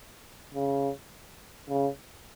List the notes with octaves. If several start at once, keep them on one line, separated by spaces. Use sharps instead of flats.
C#3
C#3